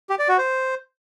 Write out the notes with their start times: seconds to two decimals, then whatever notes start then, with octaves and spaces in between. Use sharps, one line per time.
0.09 G4
0.19 D5
0.28 F#4
0.38 C5